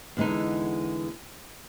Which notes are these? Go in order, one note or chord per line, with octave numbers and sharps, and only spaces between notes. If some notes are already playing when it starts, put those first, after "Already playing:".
E2 D3 G#3 B3 D#4